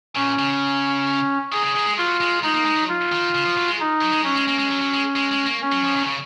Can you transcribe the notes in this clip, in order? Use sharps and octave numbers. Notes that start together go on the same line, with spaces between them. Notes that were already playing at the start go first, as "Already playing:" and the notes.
A#2 C#4
C#3
D#3 G#4
C#3
D#3
G#3
F#3 F4
G#3
G#3 D#4
A#3
G#3
F#3
F4
D#3
C#3
F3
F#3
G#3
D#4
F#3
G#3
F#3 C#4
G#3
A#3
G#3
F#3
F#3
G#3
G#3
G#3
A#3
C#4
F#3
F3
D#3
B2
C#3